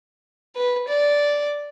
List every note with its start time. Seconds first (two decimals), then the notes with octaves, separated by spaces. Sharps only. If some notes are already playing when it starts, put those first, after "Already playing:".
0.56 B4
0.88 D5